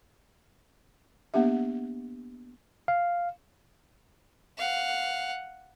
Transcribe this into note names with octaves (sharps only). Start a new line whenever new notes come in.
A#3 B3 D4 G4 E5
F5
F5 F#5